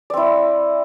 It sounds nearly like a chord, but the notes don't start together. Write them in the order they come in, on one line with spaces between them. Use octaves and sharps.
D5 C4 E4